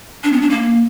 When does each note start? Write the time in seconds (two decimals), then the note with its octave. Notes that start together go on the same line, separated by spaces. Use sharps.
0.24 D4
0.33 B3
0.41 D4
0.50 A#3